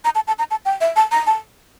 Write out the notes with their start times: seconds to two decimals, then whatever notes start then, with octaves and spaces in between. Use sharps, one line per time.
0.05 A#5
0.15 A5
0.27 A5
0.39 A#5
0.51 A5
0.65 G5
0.81 E5
0.96 A5
1.11 A#5
1.27 A5